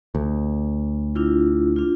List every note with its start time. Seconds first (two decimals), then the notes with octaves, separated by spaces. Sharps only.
0.15 D2
1.15 D4 E4 F4
1.76 D4 F4